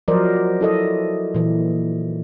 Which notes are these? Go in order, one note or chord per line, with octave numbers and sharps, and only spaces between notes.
F3 F#3 A#4 C5 D5 D#5
E4 A4 D#5
A#2 E3